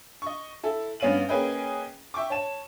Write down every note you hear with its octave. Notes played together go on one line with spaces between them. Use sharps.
D#5 C#6
E4 A4
G2 B3 C#4 F5 D#7 F#7
A#3 C#4 G#4 B4 D#5 G5
E5 G5 C#6 D6
C#5 A5 E7